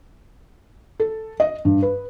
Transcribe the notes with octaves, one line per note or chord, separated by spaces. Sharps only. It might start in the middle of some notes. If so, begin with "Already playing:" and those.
A4
D#5
G2
B4